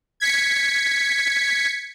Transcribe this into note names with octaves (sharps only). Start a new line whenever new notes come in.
G#6 B6 C#7